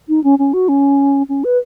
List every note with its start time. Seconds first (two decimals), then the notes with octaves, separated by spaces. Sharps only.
0.09 D#4
0.24 C#4
0.39 C#4
0.54 F#4
0.69 C#4
1.29 C#4
1.44 B4